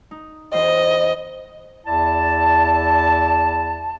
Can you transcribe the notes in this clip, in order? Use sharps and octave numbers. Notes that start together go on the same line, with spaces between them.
D#4
E2 C5 D#5
E2 E4 D5 A5